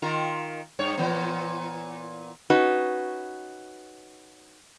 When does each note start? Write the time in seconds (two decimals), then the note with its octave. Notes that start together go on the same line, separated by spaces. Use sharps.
0.02 D#3 F4 A#4
0.79 G2 C#5
0.97 A#2 E3 B3
2.50 C#4 D#4 F#4 B4